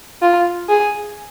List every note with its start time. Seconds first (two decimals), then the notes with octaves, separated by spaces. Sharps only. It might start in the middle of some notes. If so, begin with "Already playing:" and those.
0.22 F4
0.69 G#4